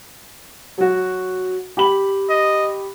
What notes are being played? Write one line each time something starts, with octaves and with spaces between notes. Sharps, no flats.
F#3 F#4
G4 B5 F#7
D#5